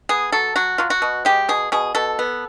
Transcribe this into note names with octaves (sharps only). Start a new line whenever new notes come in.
B3 G#4
F#3 A4
F#3 F#4
F#3 F4
F#4
B2
G#3 G4
B2 G#4
B2 G#4
B2 A4
B3